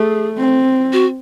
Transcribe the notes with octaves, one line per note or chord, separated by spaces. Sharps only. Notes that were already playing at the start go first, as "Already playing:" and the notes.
Already playing: A3 G#4
C4
F#4